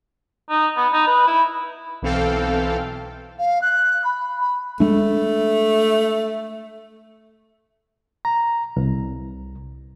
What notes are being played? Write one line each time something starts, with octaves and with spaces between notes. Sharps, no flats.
D#4
B3
D#4
B4
E4
B1 E3 C4 A4 F5 G5
F5
F#6
B5
B5
G#3 A3 D4
A#5
C2